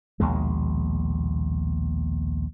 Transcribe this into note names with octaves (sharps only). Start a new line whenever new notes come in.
A#1 D#2 B2 G#3